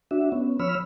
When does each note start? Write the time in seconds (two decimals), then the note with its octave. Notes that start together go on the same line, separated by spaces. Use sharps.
0.11 D4 F#4 E5
0.32 B3 C#4
0.59 F3 C#5 B5 E6 F6